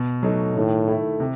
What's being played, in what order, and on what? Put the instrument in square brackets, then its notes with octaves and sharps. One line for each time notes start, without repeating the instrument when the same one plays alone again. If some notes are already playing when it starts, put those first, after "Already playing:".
Already playing: [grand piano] B2
F#3 A3 D#4
[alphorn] A2 [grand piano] D#3
[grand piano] A3 E4
C3